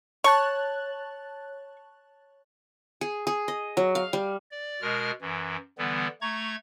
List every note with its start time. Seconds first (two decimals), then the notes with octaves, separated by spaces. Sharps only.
0.24 C#5 A5 C#6 F#6
3.01 G#4
3.27 G#4
3.48 D#5
3.77 F#3
3.95 F5
4.13 G3
4.51 D5
4.81 B2 G#3 A#4 F6
5.21 F#2 E3
5.78 D3 E3 G3 B3
6.21 A3 A#5 C#6 G#6